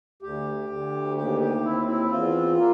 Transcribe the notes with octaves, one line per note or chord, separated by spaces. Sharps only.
D2 G4
D2
D#2 G4
G4
C4 E4
E4
E2 F4
A#3